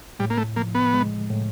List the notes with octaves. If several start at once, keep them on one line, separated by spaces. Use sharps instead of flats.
A2 G3
A#3
A3
F3 A#3
B3
G#3
A2